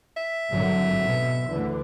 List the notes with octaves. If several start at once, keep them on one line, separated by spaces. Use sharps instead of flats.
E5
G#1 D3 F#3
B2
D2 D3 E3